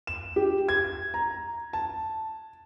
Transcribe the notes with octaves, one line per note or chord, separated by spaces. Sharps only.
E7
G4
G#6
A#5
A5